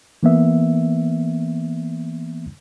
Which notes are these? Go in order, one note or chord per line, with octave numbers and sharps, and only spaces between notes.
E3 A#3 B3 E5